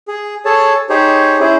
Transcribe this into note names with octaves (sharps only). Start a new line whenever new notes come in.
G#4
G#4 A4 C#5 A5
D#4 G4 G#4 C5 C#5
C#4 E4 G#4 C5